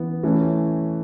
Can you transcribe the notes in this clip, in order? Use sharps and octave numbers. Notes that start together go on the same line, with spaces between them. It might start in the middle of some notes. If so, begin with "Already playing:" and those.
Already playing: E3 B3
E3 A3 C#4